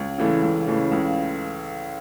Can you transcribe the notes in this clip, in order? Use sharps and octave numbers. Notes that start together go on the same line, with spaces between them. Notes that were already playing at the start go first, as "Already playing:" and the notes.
Already playing: C#2
C#3 E3 A3
C#2
C#3 E3 A3
C#2